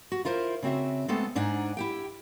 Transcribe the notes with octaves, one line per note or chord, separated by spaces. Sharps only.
F#4
E4 F4 A#4 C5
C#3 C4 F#4 E5
G#3 A3 B3 C4 A4
G#2 D4 D#4 F#5 G#5
E4 G4 G5